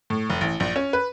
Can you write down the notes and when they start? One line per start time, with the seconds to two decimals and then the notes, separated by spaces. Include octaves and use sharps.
0.10 A2
0.30 F1
0.41 A1
0.60 A#1
0.76 C#4
0.93 B4